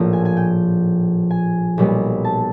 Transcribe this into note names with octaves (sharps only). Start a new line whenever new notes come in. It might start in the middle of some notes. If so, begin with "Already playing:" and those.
Already playing: A#1 A2 F3 A#3
G#5
G#5
G5
G#5
B1 A#2 G3 B3
A5